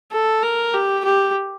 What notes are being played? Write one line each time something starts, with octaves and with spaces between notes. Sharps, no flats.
A4
A#4
G4
G4